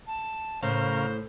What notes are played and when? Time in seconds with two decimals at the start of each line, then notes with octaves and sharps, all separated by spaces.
0.07 A5
0.63 A2 C#3 A#4 C5 F5